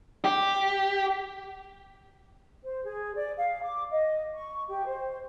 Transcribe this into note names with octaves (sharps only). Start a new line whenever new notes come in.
G4
C5
G#4
D5
F5
D6
D#5
C#6
G4
C5